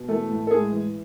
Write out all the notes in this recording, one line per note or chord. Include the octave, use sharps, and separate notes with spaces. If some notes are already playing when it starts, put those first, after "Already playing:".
Already playing: B2
E3 A3 A4
A2
A4
A2 G#3 G#4
E3